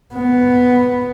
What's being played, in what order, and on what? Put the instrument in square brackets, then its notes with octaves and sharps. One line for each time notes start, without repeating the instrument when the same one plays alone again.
[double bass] B3